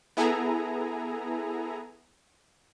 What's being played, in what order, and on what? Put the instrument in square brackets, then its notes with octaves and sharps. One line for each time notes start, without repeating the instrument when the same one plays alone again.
[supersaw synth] B3 E4 G#4 A4 G#5 A#5